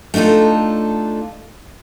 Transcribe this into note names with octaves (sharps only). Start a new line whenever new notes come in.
A3 D4 D#4 F4 A4